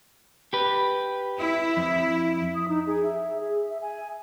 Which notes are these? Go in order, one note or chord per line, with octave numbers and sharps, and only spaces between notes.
G4 B4
E4
F2
D#6
D#4
G#4
E5
G#4
E5
G#5